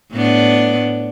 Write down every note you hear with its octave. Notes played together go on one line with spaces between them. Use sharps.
A2 B3 D4